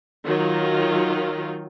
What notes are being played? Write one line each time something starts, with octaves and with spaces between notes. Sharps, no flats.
D#3 F#3 F4